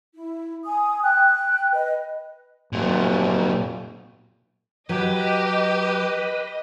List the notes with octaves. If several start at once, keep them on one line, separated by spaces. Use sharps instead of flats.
E4
G#5 D#6
G5 F#6
B4 D#5
F1 A#2 F#3
F#3 G4 B4 D#5